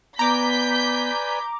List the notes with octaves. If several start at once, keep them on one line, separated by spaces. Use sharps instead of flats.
B3 B4 D5 G#5 A#5 D6 G6 B6